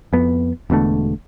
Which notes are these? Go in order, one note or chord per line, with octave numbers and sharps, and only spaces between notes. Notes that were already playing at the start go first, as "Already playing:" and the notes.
F2 B3
E1 B2 D3 A3